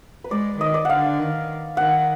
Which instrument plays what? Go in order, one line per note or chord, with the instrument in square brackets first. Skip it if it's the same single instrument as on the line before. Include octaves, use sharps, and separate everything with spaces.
[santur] B4
[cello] G#3 [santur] D5
[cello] D#3 [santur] D#5
[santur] D5
[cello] D3 [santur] F5 F#5
[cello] D#3
[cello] D#3 [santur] F#5